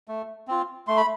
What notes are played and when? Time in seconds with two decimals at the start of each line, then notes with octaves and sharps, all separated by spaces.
0.08 A3
0.48 C4 F4
0.88 A3 C6
0.97 B5